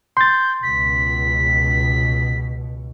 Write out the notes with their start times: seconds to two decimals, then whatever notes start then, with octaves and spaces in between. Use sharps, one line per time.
0.17 C6 G6 A6
0.63 C#2 B2 B6